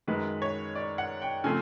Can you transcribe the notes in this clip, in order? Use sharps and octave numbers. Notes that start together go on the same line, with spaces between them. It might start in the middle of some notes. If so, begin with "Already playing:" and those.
F#2 D#3 G#3 B4
C#5
D5
F#5
G5
C#3 F3 A3 C4 G#5